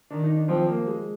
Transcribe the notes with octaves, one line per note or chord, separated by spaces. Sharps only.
D#3 D4
D#4
D4
F3 C4
A#3
G#3